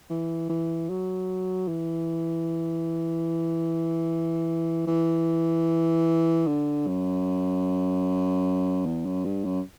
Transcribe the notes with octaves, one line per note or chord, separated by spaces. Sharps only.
E3
E3
F#3
E3
E3
D3
F#2
E2
F#2
G2
F#2